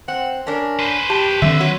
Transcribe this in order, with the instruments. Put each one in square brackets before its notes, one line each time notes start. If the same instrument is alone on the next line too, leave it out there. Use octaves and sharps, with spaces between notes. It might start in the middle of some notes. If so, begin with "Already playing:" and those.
[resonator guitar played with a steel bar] C4 [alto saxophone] F#5
[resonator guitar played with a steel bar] C#4 D4 [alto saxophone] A#4
[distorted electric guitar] B4 C5
[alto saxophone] G4 [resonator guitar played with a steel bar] A5
[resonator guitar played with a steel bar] D3 [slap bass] D#3 F#3 C4 [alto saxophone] E5
[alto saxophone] F#4 [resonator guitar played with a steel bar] C#5